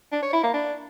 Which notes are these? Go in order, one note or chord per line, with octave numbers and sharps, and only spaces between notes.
D4
C#5
E4
A#3
D4